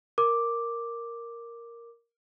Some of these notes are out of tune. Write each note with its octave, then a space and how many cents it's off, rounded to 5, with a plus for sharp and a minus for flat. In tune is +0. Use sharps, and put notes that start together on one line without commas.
A#4 +0 D6 +0